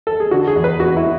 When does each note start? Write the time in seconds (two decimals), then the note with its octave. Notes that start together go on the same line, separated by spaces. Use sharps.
0.07 A4
0.20 G#4
0.31 D3 F#4
0.48 G#4
0.56 E2
0.64 B4
0.80 E2 F#4
0.97 E4